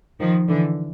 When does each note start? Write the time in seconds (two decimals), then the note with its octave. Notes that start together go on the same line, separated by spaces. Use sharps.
0.20 D#3 F3
0.48 D3 E3